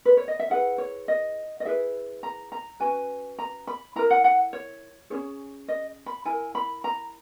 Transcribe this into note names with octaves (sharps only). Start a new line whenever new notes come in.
B4
C#5
D#5
E5
E4 G#4 B4 F#5
C#5
D#5
D#5
E4 G#4 B4 E5
A#5
A#5
C#4 F#4 B4 G#5
A#5
B5
E4 A#4 A#5
F#5
F#5
C#5
C#4 E4 G#4 C#5
D#5
B5
E4 A#4 G#5
B5
A#5